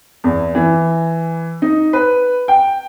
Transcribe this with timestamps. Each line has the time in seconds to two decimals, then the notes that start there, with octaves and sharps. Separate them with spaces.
0.24 E2
0.55 E3
1.62 D#4
1.93 B4
2.48 G5